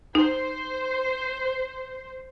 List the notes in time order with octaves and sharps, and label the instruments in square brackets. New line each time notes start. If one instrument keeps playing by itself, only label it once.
[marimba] D#4 [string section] C5